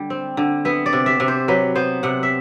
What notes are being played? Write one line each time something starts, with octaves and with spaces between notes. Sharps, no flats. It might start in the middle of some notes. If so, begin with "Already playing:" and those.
Already playing: D3 G3
C4
D3
B3 E5
D5
C3
E5
C3
C5
F#3 B4
B3 C5
C3 F#5
E5